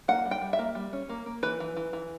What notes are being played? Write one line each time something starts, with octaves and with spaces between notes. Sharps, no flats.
A#3 F#5
G3
G5
G3
E5
A#3
G3
C#4
A#3
A#3
E3 B4
E3
E3
E3